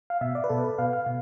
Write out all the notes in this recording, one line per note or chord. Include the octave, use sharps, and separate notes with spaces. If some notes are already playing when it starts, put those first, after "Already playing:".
F5
B2 E5
D5
B4
B2 A4
B4
B2 F5
F5
B2